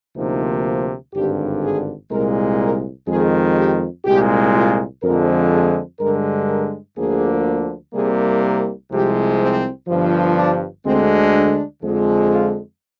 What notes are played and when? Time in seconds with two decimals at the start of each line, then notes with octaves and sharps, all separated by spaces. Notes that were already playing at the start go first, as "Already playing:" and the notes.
0.16 D2 C3 F3 A#3 D#4
1.13 G#1 G2 D3 G4
1.62 G#4
2.11 C2 A#2 G#3 A#4
2.59 A#4
3.08 F2 D#3 G#3 G#4
3.56 G4
4.05 C2 A#2 G#3 G4
4.54 F4
5.02 F2 D3 F3 G#3 A#4
5.50 G#4
5.99 G2 D3 G#3 A#4
6.48 A#4
6.96 D2 D3 F3 A#3 G#4
7.93 C2 C3 G3 A#3 G#4
8.42 A#4
8.91 C2 C3 F3 G#3 G4
9.39 C4
9.87 G1 G2 F3
10.36 D4
10.85 D2 D3 G#3 C4
11.33 D4
11.82 F2 D3 F3 G#3
12.30 F4